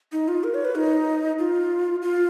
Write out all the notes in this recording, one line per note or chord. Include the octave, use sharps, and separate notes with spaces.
D#4
F4
A#4
C#5
B4
D#4
F4
F4